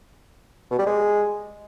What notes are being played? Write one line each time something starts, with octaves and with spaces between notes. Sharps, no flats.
B2
G3
G#3